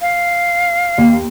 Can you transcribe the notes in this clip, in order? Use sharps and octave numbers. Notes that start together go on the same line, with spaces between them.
F5
D#2